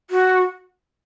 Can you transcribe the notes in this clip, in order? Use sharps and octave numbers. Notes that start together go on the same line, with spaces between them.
F#4